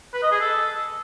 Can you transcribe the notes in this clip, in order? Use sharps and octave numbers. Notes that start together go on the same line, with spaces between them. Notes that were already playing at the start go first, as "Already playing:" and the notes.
B4
D#5
G#4
A4